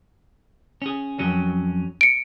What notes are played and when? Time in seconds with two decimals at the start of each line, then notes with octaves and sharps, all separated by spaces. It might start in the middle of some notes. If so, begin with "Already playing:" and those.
0.82 C#4 G#4
1.19 F2 F#3 C#4
2.01 C#7 D7